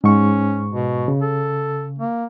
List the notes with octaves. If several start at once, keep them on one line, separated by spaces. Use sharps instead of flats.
G#2 C#4 C#6
B2
C#3
A4
A#3